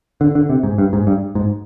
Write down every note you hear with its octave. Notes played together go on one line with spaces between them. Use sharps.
D3
D3
C3
G#2
G2
G#2
G2
G#2